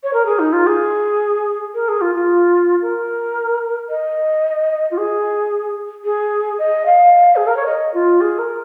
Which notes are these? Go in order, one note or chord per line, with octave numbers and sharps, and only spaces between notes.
C#5
A#4
G#4
D#4
F4
G#4
A#4
G#4
F4
F4
A#4
D#5
F4
G#4
G#4
D#5
F5
G#4
A#4
C#5
D#5
F4
G#4
A#4